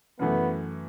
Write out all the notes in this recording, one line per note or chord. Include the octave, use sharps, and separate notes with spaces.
F#2 E3 A3 B3